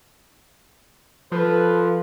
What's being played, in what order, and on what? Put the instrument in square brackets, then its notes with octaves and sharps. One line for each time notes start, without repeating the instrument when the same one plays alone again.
[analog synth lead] F3 [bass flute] A4 [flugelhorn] B4